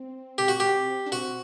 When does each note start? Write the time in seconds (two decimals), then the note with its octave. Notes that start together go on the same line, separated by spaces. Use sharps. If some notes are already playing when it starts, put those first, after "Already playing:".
Already playing: C4
0.38 G4
0.48 F#4
0.60 G4
1.06 D4
1.12 C4 F#4